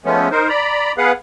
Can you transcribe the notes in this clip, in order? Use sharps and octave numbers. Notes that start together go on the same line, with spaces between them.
F3 G#3 A3 B3 C#4
D#4 A#4 C5
D5 A#5 B5
B3 G#4 B4 F5 F#5